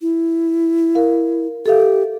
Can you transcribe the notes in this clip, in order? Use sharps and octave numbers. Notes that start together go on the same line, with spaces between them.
E4
A#4 F5
G4 A4 E5 F5